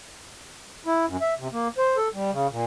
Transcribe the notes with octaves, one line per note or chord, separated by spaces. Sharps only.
E4
F#2
E5
C3
A#3
C5
A4
G3
C#3
A#2